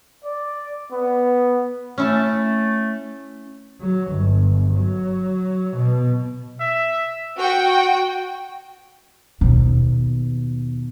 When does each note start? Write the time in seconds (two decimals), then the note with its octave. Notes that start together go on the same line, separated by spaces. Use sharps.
0.24 D5
0.91 B3
1.98 A3 C#4 E4 A5
3.81 F#3
4.12 G1
4.76 F#3
5.77 B2
6.60 E5
7.38 F#4 G5
9.41 D#2 B2